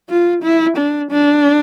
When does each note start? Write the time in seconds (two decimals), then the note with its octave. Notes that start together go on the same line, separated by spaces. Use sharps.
0.10 F4
0.43 E4
0.77 D4
1.11 D4